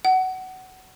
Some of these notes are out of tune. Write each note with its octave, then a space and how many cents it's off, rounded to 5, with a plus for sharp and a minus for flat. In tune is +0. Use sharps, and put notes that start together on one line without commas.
F#5 +20